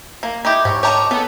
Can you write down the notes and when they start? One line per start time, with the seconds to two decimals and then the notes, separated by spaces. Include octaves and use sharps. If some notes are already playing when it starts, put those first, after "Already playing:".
0.23 A#3
0.45 D#4 E4 G4
0.65 G#2 G4 C#5
0.83 D#3 A3 G4 C#5 A5 A#5
1.11 B3 A4